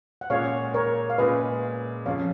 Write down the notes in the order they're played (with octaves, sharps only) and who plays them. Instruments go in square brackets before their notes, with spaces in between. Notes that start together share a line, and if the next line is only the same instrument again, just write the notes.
[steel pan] F#5
[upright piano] A#2 G#3 C#4 G#4 [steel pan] C#5 F5
[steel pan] A#4 C#5
F5
[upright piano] A#2 G#3 C#4 G#4 [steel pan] B4 D#5
[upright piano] F2 C#3 F3 [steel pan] C#5 F5